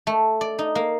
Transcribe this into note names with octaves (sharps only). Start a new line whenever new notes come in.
A3
D5
D#4
A#3